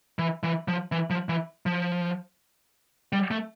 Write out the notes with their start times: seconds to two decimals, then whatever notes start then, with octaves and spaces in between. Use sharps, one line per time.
0.19 E3
0.43 E3
0.68 F3
0.92 E3
1.10 F3
1.29 E3
1.66 F3
3.13 G3
3.31 A3